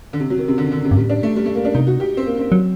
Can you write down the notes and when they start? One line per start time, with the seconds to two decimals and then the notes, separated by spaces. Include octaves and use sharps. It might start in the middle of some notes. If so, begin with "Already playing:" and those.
0.13 D3
0.20 C3
0.30 F#3
0.38 D#3
0.48 C3
0.58 D3
0.72 D3
0.85 C3
0.91 G2
0.97 A2 G3
1.10 D4
1.23 A3
1.36 G3
1.46 A3
1.55 A#3
1.65 D4
1.74 C3 D#4
1.87 F#4
2.00 G4
2.17 C4
2.26 A#3
2.39 C4
2.52 F#3